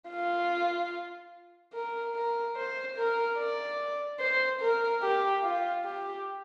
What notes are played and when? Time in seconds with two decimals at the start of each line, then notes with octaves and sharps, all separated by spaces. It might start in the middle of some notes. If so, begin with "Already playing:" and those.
0.09 F4
1.74 A#4
2.15 A#4
2.56 C5
2.96 A#4
3.38 D5
4.20 C5
4.61 A#4
5.02 G4
5.43 F4
5.85 G4